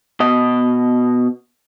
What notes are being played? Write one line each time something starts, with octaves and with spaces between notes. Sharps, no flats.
B2 D#5